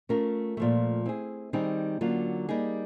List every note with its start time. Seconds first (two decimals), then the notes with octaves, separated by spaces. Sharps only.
0.09 A3 C#4 F4 A#4
0.57 A#2 F3 A3
1.06 C4 E4 G#4
1.53 D#3 G3 C4 D#4 G#4
2.01 D3 F#3 A#3 C#4 F4
2.49 G3 A#3 D#4 G#4